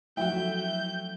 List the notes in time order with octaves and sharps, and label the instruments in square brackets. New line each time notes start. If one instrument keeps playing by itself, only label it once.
[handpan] F3 F#3 A3 [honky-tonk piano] E4 F#4 [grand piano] G5 [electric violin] G6